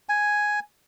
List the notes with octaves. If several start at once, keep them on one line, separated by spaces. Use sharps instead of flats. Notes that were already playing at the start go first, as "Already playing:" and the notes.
G#5